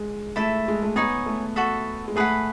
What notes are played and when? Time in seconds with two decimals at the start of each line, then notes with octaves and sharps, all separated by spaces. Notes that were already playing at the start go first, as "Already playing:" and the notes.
Already playing: G#3
0.36 A3 E4 A4 E5
0.68 G#3
0.83 A3
0.96 B3 D#4 G#4 C#5
1.26 A3
1.56 F#4 A4 E5
2.08 G#3
2.16 A3 G#4 B4 F#5 B5